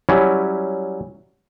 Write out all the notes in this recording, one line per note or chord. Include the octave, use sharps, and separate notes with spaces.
F#3 G3 C#4 E4